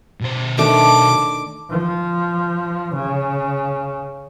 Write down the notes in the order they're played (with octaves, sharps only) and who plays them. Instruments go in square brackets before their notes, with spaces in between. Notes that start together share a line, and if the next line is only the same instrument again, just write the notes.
[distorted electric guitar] B2 C5
[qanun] D#3 A3 D4 [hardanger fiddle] D6
[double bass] F3
C#3